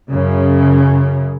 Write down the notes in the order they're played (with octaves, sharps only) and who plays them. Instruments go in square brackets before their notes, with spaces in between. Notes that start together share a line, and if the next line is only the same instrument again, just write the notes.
[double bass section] F#2 C#3